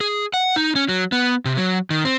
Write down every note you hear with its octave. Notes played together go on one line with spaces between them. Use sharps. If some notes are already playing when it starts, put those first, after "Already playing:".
G#4
F#5
D#4
C#4
F#3
B3
C3
F#3
D#3
C4